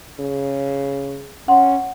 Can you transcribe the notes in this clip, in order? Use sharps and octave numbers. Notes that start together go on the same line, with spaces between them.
C#3
C#4 F#5 C6